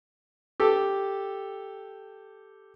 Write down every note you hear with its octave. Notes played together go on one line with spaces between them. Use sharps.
G4 A4